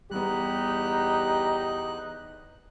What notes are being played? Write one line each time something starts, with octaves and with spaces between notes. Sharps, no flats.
E2 G3 B3 D#4 G4 F#6